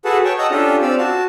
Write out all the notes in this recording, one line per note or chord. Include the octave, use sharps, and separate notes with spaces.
F#4 G#4 A4 B4 F#5 A5
C#5 G5 A5 C#6
D#5 F#5 A5 A#5 D#6 E6
C#4 D4 F4 G4 A4
C4 D5 F5 E6
F#4 A5